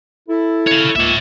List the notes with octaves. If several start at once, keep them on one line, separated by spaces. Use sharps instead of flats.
E4 A4
C#5 F5
C#2 A#3 C#5 E5